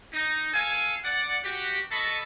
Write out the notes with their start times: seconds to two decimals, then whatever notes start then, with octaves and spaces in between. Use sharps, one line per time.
0.14 D#4
0.54 A4 F5 G#5
1.05 D5 F#5
1.44 F#4 G4
1.92 A4 D#5 A5 B5 C#6